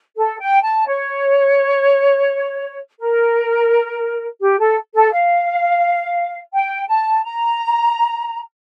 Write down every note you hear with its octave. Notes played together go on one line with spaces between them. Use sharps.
A4
G5
A5
C#5
A#4
G4
A4
A4
F5
G5
A5
A#5